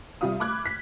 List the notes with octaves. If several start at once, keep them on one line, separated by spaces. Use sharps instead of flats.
C3 G3 F4 E5 F5 D#6
B5 D6 F6 F#6 G#6
B6